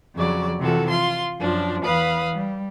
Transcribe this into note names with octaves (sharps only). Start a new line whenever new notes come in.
F2 C#3 F#3 D5
C3 E3 F3 F#4 A4
F4 C6
F#2 F3 D4 F4
E2 B4 F5 B5 D#6
G3